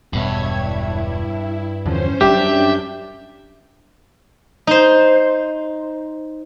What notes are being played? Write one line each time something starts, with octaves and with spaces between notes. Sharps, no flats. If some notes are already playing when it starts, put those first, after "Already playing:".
E1 G2 B2 C#5 E5 G#6
E4
E2 D3 F3 C#4 C5
F#2 G3 D4 G4 E5 G6
D#4 C5